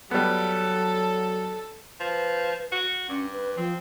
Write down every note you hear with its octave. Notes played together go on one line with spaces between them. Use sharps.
F#3 G3 B3 A4
F3 B4
F#4
G2 C#4
B4
F3 C4